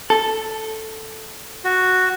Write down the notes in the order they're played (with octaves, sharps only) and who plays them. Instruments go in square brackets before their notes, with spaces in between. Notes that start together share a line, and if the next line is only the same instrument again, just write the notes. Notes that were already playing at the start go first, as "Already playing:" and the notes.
[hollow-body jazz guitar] A4
[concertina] F#4